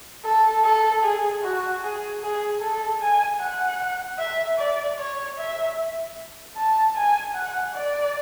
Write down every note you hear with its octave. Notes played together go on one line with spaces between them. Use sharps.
A4
A4
G#4
F#4
G#4
G#4
A4
G#5
F#5
E5
D5
C#5
E5
A5
G#5
F#5
D5